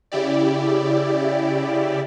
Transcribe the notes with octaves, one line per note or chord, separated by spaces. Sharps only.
C#3 E4 G4 D5